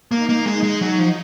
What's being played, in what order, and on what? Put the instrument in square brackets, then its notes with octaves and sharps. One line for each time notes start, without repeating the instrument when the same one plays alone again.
[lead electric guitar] A#3 [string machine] D#4
[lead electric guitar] A#3
G#3
G#3
F#3
F3